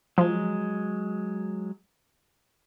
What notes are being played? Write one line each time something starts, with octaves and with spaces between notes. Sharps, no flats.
F3 F#3 G#3